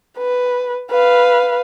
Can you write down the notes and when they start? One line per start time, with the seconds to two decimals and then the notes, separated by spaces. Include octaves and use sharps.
0.18 B4
0.91 B4 F5